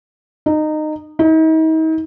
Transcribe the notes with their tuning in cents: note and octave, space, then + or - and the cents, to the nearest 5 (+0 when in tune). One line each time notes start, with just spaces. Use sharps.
D#4 -20
D#4 +40